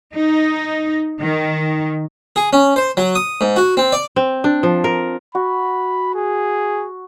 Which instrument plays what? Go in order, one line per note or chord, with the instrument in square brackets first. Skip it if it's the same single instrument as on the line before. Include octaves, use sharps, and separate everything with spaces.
[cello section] D#4
D#3
[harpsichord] G#4
C#4
C5
F#3
D#6
G#2
F#4
C4
D5
[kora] C4
D4
F3
A#4
[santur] F#4 [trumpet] B5
[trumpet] G#4